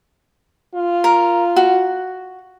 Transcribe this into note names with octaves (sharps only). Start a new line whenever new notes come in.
F4
A#4
F#4